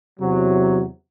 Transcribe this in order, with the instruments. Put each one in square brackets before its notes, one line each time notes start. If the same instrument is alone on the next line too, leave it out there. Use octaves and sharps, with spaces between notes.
[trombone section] E2 C3 F#3